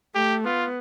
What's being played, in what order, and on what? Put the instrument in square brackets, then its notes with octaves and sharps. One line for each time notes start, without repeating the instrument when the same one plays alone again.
[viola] A3 [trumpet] G4
[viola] B3 [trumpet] F4